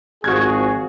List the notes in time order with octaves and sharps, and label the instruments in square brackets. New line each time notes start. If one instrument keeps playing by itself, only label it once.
[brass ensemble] G#1 F3 G#4 [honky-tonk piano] F#4 G#6